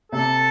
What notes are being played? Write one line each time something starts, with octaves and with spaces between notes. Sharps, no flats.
C3 A4